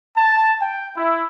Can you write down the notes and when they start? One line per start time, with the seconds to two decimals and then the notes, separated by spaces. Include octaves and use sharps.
0.17 A5
0.62 G5
0.97 E4